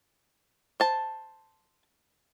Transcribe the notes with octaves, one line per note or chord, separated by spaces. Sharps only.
C5 A5